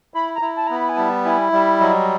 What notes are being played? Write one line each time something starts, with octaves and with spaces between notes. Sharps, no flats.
E4 B5
A#5
E4
A5
B3 A#5
B5
G#5
G3 A5
E4 G#5
G3 E5
F#3 D#5